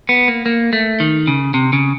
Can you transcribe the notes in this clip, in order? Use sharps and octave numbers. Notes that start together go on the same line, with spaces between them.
B3
A#3
A#3
A3
D#3
C#3
C3
C#3